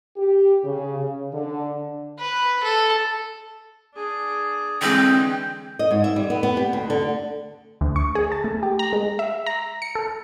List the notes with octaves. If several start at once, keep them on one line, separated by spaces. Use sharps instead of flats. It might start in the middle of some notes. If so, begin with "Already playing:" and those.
G4
C#3
C#3
D3
B4
A4
D4 G#4
D3 E3 G#3 C4 G#4 G5
D#5
G#2
E5
G3
B3
B3
G4
D2
D3
D2
C#6
G#4
A5
A3
G4
A#5
G#3
E5
A#5
C#7
A4